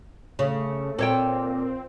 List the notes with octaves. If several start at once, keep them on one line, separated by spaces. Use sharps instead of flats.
C#3 A3
A#2 C4 A4 C#5 G5